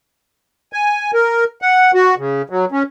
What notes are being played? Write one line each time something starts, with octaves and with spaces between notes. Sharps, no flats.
G#5
A#4
F#5
F#4
C#3
F#3
C#4